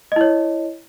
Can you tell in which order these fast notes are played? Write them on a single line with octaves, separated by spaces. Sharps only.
D#5 E4 C#5